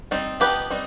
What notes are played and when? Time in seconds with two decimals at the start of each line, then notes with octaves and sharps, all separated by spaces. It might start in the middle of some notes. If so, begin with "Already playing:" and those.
0.11 G3 C4 D#4
0.40 F3 B3 D#4 G4 B4
0.70 G3 C4 D#4